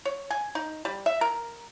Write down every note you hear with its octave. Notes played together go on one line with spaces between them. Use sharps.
C#5
G#5
D#4
G3
E5
A#4